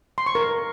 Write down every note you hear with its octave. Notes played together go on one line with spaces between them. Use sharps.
C6
C#6
A#4